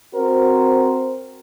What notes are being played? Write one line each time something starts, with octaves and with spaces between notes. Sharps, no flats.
C4 F#4 A#4 C5